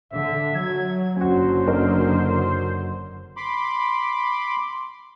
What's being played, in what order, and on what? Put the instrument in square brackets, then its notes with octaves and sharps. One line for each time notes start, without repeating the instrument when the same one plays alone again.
[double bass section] D3 [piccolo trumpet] E5
[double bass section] F#3 [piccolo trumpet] G#6
[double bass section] F#1 D3 F#3 [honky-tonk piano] C#4 F#4 [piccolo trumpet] C5
[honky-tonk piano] C#4 D#4 A#4
[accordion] B5 C6 D6